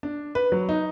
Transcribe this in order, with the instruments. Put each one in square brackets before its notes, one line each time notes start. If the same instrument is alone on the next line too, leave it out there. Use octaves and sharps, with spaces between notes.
[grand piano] D4
B4
F#3
D#4